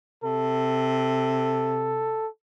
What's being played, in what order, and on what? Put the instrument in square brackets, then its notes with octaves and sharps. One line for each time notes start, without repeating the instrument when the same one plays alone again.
[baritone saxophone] C3 [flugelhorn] A4